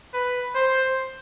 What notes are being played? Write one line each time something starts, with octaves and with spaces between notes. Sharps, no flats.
B4
C5